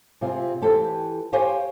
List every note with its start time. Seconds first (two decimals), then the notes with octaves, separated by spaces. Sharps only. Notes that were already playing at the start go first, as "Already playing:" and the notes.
0.21 C3 C4 F4 G#4
0.62 E3 G4 A4 C5
1.33 G4 C5 C#5 F5 G#5